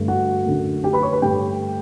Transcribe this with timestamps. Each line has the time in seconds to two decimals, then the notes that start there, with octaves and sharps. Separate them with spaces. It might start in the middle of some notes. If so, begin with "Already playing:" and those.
Already playing: G2 D3 A3
0.08 F#4 F#5
0.45 F#2 D3 A3
0.84 G4 G5
0.93 B4 B5
1.03 C#5 C#6
1.12 B4 B5
1.22 G2 D3 A3 G4 G5